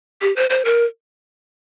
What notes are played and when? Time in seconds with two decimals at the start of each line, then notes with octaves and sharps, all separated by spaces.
0.21 G4
0.36 C5
0.50 C5
0.65 A#4